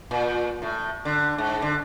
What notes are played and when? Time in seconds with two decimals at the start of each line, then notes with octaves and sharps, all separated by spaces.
0.11 A#2
0.62 A2
1.05 D3
1.38 G#2
1.62 D3